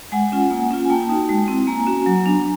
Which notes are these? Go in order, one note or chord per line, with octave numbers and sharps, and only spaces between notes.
G#3 F#5 G#5
C#4 F4
A#3
C#4 F4
G#5
A#3 G5 A5
D#4 F#4
G#3
C4 E4
A#3 G#5 A#5
C#4 F#4
F#3
B3 D4